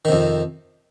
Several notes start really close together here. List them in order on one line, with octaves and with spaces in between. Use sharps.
D#3 C3 F2